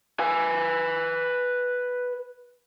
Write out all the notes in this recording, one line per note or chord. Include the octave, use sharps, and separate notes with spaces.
B4 G#5